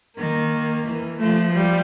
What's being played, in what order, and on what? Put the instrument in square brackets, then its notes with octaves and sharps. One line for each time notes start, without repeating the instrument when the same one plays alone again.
[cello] D#3 [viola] A#3
[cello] E3
[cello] F3 [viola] A3
[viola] G3